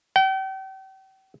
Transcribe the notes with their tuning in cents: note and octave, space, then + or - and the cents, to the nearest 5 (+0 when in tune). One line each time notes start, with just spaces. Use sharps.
G5 -40